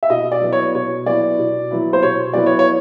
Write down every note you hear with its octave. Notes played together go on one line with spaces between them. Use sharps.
E5
B2 D#5
D5
F#3 B3 E4
C#5
B2 C#5
F#3 B3 E4 D5
B2
F#3 B3 E4
C5
B2 C#5
F#3 B3 E4 D5
C#5
C#5